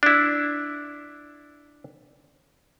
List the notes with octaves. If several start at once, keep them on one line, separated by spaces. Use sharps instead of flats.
D4 E4